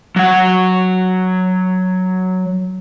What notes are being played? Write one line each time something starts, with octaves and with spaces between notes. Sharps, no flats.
F#3 F#5